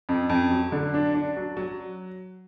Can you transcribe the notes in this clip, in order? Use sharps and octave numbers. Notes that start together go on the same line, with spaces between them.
F2
F2
F#3
D3
D4
D4
F#3
F#3